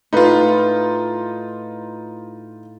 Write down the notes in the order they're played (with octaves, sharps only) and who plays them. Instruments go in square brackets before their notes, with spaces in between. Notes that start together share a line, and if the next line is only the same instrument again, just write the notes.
[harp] A2 B4 [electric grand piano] D#4 F4